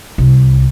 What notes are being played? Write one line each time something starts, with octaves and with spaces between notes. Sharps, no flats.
C2